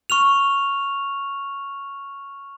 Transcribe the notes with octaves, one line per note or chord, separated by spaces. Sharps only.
C#6 F6 F7